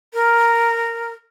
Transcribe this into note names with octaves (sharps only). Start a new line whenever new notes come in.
A#4